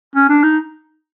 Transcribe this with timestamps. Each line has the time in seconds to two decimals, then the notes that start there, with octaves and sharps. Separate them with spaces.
0.15 C#4
0.29 D4
0.43 D#4